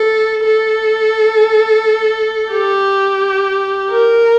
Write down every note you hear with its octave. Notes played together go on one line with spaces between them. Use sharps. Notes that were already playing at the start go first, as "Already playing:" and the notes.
Already playing: A4
A4
G4
A#4